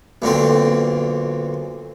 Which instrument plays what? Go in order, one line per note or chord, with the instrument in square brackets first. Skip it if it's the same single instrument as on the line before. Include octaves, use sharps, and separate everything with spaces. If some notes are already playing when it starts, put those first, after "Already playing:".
[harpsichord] B1 A#2 D3 C4